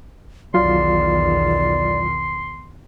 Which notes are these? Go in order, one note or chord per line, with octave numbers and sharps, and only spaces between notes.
B1 E2 D#3 F#3 F4 D5 C6